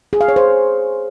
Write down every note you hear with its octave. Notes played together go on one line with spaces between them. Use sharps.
G#4
F5
C#5
C5